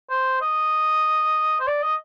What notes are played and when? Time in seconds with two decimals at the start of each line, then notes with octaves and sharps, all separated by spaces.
0.10 C5
0.42 D#5
1.60 C5
1.67 D5
1.83 D#5